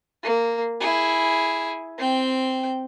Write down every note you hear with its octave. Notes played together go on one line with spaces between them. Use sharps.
A#3
E4 G#4
C4 G5